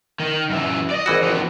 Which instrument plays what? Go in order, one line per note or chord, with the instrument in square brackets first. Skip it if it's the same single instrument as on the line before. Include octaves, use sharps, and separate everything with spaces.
[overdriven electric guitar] D#3
F#2 E3
D5 D#5
[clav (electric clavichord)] G#1 E3 F#4
[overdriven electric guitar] F3 B3